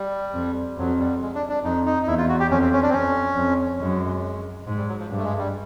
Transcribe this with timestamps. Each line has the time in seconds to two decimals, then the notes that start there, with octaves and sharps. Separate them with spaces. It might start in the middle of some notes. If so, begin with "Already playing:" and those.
Already playing: G3
0.34 F2
0.77 F2 F#3
0.99 G3
1.21 G#3
1.35 D4
1.49 D4
1.64 F2 D#4
1.86 D#4
2.03 D#4
2.07 E2 E4
2.18 F4
2.29 F#4
2.39 G4
2.51 F2 C#4
2.61 C4
2.73 C#4
2.82 D4
2.89 C4
2.93 F2 C#4
3.37 F2
3.80 F#2 G#3
4.67 G#2
4.77 G3
4.88 F#3
4.99 F3
5.10 G2
5.17 A3
5.24 G#3
5.38 G3